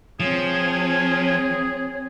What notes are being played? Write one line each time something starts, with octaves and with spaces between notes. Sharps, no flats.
F3 C4 G#4 C#5